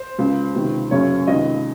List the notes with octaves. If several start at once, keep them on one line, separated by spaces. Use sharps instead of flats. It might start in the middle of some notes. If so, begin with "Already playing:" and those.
Already playing: C5
C#2 C#3
C#2 C3 D#3
F#1 F#2 C#3 C#5
C#2 C3 D#3 D#5